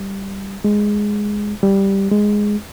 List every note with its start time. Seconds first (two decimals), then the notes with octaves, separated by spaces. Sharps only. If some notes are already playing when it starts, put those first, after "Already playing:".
Already playing: G3
0.64 G#3
1.63 G3
2.11 G#3